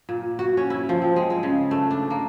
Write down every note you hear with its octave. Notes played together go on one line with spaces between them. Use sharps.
A#2
F#4
C#4
E4
F3
C4
G#3
G#3
C#3
A3
D4
A#3